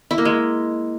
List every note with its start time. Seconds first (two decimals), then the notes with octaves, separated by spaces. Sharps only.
0.11 E4
0.18 A#3
0.25 G#3